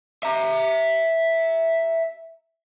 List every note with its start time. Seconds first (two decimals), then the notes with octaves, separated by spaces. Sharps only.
0.23 E5 A#5